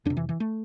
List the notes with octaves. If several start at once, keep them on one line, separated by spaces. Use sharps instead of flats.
F2 C3 D4
E3
E3
A3